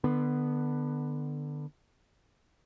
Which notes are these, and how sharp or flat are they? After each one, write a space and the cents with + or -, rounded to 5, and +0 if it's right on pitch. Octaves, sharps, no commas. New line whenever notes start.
D3 +25 B3 +0